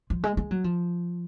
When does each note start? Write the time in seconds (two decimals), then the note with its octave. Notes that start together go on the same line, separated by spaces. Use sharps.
0.10 F3
0.24 G#3
0.37 G#3
0.51 F#3
0.64 F3